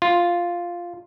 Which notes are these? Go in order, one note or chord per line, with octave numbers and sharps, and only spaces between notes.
F4